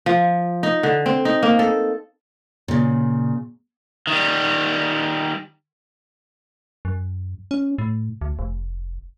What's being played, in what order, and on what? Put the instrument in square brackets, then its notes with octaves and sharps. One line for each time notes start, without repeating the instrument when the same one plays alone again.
[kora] F3
D#4
D3
C4
D#4
A#3
A4
[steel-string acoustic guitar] A#2 C#3
[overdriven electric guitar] D#3 G3
[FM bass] F#2
C#4
A2
D2
F1